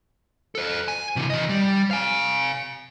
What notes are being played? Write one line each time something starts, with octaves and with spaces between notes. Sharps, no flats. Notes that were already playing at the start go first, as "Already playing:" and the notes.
A4 C5
G#5
C3 E3
E3 D#5
G3
F5 G#5